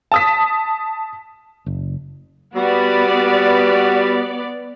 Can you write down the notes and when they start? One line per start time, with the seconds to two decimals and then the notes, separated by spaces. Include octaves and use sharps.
0.12 A5 D#6 B6
1.66 F#1
2.55 G3 B3 F#4 D5